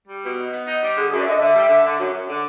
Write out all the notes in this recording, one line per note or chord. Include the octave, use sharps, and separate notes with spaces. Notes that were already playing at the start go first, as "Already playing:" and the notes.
G3
B2
D#4
B3
D#4
G3
D3 G#4
G#4
F#2
D5
D3 D#5 E5
D3 E5
G3
D3
D3
F#2
F#2
D3